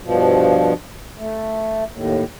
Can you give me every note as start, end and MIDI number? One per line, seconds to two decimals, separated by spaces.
0.01 0.73 43
0.01 0.73 47
0.01 0.73 53
1.18 1.84 57
1.91 2.24 39
1.91 2.24 45